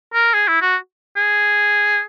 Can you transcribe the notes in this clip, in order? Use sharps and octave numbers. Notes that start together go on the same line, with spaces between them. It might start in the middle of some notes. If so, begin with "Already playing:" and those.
A#4
G#4
E4
F#4
G#4